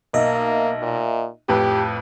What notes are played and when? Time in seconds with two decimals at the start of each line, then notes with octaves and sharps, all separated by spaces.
0.14 B1 A#3 D#5 E5
0.82 A#2
1.49 F2 A2 G4 B4